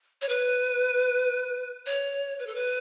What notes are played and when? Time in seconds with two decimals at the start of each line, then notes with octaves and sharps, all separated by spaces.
0.22 C#5
0.29 B4
1.86 C#5
2.39 B4
2.47 A4
2.55 B4